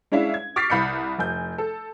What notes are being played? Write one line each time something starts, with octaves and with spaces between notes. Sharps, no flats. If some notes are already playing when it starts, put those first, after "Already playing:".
G#3 C#4 D4 E4 E5 F5
G#6
C#6 D6 F6 A6 B6 C7
C2 B5 G6 C#7
F1 G#5 G6
A4